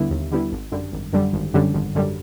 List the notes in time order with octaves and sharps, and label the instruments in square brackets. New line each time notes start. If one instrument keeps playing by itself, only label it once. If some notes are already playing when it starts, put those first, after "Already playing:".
Already playing: [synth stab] D#2 D3 G3 B3 E4
D#2
D3 G3 B3 E4
G#1
F#2 D3 G3
G#1
F#2 D3 G3
G#1
F#2 D3 G3
G#1
F#2 D3 G3